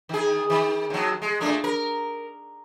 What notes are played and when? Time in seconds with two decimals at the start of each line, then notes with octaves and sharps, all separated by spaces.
0.09 D#3 G#4
0.50 D#3
0.90 D#2 F#3
1.22 G#3
1.40 A#2 A3 D4
1.64 A#4